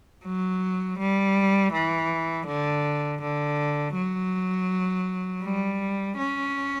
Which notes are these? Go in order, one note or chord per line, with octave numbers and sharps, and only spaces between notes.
F#3
G3
E3
D3
D3
F#3
G3
C#4